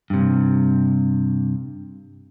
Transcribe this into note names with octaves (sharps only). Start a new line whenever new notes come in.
G2 C3